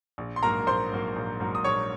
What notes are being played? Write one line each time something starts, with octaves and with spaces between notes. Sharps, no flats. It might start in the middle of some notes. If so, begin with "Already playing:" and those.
A#1
C6
G#2 F#3 A#3 A#4 A#5
A#1 C5 C6
G#2 F#3 A#3
A#1
G#2 F#3 A#3
D#6
A#1 C#5 C#6